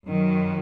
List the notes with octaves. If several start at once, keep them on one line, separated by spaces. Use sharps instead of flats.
F#2 D#3 F#3